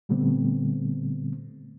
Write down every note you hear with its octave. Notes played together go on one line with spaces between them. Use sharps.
A#2 D3 G3 A3 B3 C4